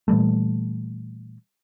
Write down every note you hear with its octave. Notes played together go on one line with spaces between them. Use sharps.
A#2 E3 G3 A3